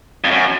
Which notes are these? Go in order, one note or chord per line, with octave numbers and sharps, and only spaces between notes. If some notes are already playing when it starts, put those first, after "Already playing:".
F2
F#2